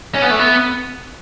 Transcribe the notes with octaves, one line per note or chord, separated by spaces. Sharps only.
C#4
B3
A3
B3